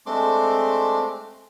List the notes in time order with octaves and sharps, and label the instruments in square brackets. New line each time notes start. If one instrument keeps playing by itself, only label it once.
[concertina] G#3 A3 C4 D4 C6 D6